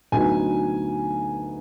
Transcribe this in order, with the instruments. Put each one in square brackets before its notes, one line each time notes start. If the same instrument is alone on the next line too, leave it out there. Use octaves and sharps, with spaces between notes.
[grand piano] D2 D3 F#3 B3 D#4 G#5